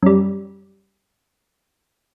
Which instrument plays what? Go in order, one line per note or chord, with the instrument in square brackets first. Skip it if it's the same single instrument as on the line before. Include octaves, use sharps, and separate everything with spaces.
[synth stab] F#2 G3